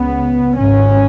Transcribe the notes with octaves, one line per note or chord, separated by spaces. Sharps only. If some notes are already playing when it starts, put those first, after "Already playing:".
Already playing: C#2 C#3 B3
G#1 G#2 C#4